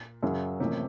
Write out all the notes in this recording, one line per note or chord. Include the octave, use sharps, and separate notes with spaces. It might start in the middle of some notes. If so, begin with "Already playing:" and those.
Already playing: A#2
F#2 C#3 F#3
A1 A2 C3 F3 A#3 C#4